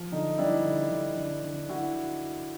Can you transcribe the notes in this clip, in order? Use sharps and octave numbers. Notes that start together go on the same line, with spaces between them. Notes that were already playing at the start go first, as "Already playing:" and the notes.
Already playing: F3
D3 D#4
G3 D4 E4
D3
D3
D3
D3
D3 E4 F#4